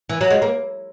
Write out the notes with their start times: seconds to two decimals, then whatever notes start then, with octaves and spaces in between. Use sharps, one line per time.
0.09 E3
0.21 F#3
0.30 G#3
0.42 A#3